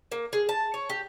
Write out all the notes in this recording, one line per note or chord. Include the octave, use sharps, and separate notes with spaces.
A#3
G#4
A5
C#5
G4